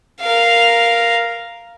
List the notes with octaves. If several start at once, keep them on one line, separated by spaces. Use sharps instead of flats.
A#4 F5